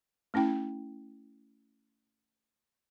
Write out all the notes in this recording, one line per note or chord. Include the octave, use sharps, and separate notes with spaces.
A3 C#4 E4 G5